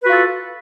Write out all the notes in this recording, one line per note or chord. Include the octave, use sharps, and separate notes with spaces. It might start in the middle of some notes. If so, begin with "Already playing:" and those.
F4 F#4 A4 B4